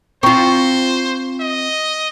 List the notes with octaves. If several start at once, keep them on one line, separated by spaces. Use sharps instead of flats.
C4 F4 C5 A#5 C#6
D#5